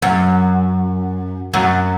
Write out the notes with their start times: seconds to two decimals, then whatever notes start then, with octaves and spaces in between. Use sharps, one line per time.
0.02 F#2
1.53 F#2